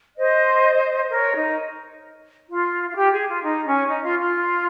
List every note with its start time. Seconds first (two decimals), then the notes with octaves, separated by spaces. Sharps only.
0.17 C5 D#5
1.10 A#4 C#5
1.34 D#4
2.49 F4
2.89 F4
2.95 G4
3.11 G#4
3.27 F4
3.43 D#4
3.66 C#4
3.89 D#4
4.04 F4
4.19 F4